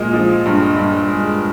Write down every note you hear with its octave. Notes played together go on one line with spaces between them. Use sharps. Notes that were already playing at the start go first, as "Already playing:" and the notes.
Already playing: A#2 G#3 D#5
F3
G2
G2
G#3